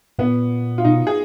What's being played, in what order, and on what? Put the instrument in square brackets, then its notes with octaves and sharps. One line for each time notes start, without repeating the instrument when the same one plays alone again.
[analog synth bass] A#2 [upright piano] B3
[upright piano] F4
[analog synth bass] B2 [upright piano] D#4
[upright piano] G#4